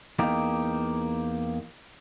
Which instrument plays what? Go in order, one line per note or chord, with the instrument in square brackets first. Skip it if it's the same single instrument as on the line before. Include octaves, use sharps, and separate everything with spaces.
[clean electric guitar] E2 A#3 D#4 G4